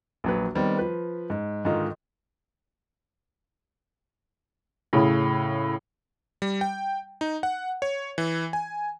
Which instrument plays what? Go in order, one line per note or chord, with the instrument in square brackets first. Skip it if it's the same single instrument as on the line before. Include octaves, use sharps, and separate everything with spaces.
[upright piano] A#1 F#3 B4
D#3 G3 B3 C4
F3 B4
G#2
G#2 D3 D#3 D#4 F4
[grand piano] A2 C#3
[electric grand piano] G3
G5
D#4
F#5
C#5
E3
G#5